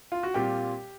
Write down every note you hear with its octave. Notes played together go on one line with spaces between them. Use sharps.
F4
F#4
A#2 G3 C4 F4 G4